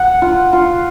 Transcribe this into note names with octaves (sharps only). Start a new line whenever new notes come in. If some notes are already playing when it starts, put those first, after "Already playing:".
Already playing: F#5
F4
F4